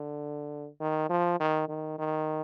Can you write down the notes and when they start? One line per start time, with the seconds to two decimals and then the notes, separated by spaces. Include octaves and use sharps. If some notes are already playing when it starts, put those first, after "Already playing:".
Already playing: D3
0.81 D#3
1.10 F3
1.40 D#3
1.69 D#3
1.98 D#3